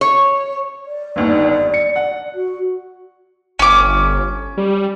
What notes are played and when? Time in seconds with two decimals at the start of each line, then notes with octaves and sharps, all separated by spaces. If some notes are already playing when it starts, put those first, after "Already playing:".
0.01 C#5
0.86 D5
1.16 G1 D#2 G#2
1.74 C#7
1.96 F#5
2.35 F#4
3.59 G1 C#4 D6
4.57 G3